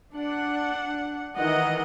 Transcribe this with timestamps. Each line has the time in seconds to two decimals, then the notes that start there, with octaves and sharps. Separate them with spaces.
0.15 D4 F#5
1.38 D#3 E3 D#5 F#5